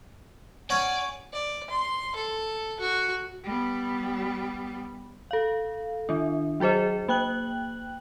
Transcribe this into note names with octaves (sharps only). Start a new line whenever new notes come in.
C#4 C#5 D5 F#5 G#5
D5
C6
A4
F#4
G3 B3
A4 F5
D#3 D4
F#3 F#4 G#4 C5 D#5
A#3 G5 F#6 F#7